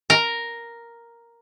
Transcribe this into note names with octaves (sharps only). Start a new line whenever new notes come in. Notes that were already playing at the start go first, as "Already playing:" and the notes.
A#4